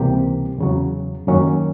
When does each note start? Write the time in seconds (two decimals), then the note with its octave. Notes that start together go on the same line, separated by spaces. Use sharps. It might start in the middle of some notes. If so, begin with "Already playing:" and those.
Already playing: C#2 C3 E3 G3 A#3 G4
0.58 E2 C#3 F#3
1.27 F#2 D#3 F#3 A#3 C#4